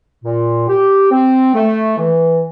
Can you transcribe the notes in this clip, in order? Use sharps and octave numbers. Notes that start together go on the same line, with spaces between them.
A#2
G4
C4
A3
E3